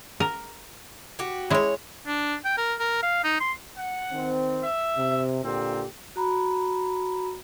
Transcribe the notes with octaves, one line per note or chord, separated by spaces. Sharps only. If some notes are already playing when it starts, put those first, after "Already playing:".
A#4
F#4 G4
G#3 E4 C5 C#5
D4
G5
A#4
A#4
F5
D#4
C6
F#5
D#3 C4
E5
C3
A#2 D3 C4 G4
F#4 A#5 B5